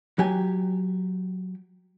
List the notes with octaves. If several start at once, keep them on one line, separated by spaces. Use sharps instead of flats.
F#3 G4 G#5